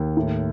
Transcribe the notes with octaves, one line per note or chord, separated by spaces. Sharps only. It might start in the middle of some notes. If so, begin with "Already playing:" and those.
Already playing: D#2
A2